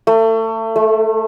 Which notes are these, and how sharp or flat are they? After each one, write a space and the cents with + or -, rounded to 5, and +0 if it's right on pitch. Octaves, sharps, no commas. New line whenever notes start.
A3 +30
A3 -15